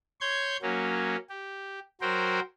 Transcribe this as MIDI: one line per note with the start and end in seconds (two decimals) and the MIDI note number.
0.21 0.57 73
0.21 0.57 84
0.21 0.57 91
0.21 0.57 92
0.62 1.16 54
0.62 1.16 58
0.62 1.16 61
1.29 1.80 67
2.01 2.40 54
2.01 2.40 66
2.01 2.40 70
2.01 2.40 72
2.01 2.40 79